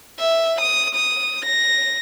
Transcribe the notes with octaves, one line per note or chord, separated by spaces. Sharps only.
E5
D#6
D#6
A#6